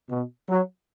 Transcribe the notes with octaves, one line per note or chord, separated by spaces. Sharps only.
B2
F#3